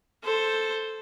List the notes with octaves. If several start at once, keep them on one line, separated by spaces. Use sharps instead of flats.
A4 C5